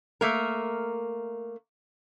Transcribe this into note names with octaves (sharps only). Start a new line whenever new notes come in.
A3 A#3 A#4